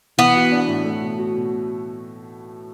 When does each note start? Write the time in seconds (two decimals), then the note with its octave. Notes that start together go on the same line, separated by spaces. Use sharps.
0.18 E3 B3
0.35 F#4
0.51 D4
0.68 A2
0.85 A3
1.02 B2
1.18 F#4
1.34 B2